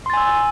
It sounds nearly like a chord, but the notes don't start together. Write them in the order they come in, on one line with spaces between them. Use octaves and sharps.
C6 A6 G#5 E6